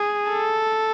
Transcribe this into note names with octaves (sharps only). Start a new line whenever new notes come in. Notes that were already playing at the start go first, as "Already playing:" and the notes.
Already playing: G#4
A4